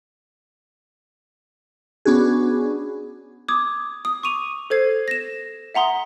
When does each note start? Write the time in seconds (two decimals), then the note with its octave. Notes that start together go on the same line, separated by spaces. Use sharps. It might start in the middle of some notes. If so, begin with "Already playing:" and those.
2.05 B3 C#4 D4 F#4 G#4
3.48 D6 D#6 G#6
4.05 D#6
4.23 C#6 D6 D#7 F7
4.70 A4 C5 G#6 C7
5.08 A#6 E7
5.74 E5 F#5 A#5 C6 D#6